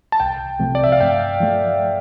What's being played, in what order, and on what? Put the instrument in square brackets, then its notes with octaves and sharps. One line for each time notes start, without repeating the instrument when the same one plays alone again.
[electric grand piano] A5
[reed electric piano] C2 [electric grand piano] G5
[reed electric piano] C3 F3 A3 C4
[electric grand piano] D5
E5
F5
[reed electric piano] G2 [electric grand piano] G5
[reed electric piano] F3 A3